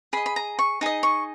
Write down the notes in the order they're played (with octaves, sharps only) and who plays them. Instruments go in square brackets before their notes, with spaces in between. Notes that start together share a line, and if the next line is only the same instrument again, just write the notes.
[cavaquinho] G#4 B5
D#5
B5
A#5
C#6
D#4 G#4 D#5
C#6